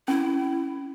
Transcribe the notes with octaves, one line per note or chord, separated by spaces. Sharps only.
C#4 E4